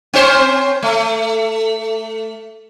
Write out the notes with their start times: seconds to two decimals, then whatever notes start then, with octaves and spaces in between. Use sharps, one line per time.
0.14 C4 C#4 C5
0.83 A3